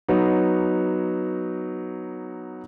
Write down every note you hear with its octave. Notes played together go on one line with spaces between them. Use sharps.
F#3 B3 D#4